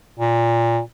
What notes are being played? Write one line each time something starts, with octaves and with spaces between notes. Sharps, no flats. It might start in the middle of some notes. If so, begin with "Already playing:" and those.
A#2